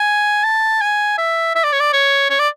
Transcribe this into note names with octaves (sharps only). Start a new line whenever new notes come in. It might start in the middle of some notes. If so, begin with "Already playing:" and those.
Already playing: G#5
A5
G#5
E5
E5
D5
C#5
D5
C#5
C#5
D5